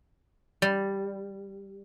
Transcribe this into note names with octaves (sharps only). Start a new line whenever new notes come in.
G3